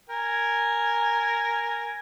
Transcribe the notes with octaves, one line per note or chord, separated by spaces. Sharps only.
A#4 G#5